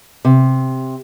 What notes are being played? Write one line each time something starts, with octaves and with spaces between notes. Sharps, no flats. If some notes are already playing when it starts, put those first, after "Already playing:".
C3